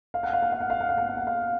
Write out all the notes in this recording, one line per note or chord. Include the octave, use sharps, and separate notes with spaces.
F5
F#5
F5
F#5
F5
F#5
F5
F#5
F5
F#5
F5
F#5
F5